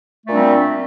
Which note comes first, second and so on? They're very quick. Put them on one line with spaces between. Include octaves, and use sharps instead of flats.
A3 A#2 D4 C4 G3